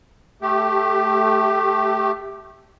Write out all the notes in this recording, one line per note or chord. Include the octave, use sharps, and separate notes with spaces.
A3 G4